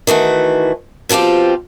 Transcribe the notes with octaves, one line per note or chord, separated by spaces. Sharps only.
D#3 E3 A3 F#4
B2 F3 C4 F4 G4